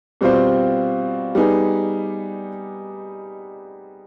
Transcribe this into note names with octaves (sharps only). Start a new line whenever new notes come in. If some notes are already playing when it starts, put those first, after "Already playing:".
B2 G3 C4 F4 C5
G3 B3 D#4 G#4